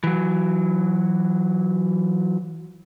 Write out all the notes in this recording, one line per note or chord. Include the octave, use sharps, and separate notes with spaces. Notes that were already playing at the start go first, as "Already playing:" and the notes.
E3 F#3